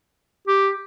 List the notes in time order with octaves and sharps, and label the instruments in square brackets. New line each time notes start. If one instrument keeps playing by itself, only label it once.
[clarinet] G4